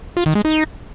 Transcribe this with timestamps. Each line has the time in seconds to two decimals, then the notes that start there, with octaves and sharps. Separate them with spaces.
0.17 F4
0.26 D#3
0.35 G#3
0.45 D#4